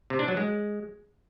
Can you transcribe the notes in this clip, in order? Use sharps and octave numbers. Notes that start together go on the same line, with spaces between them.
C3
D4
F#3
G#3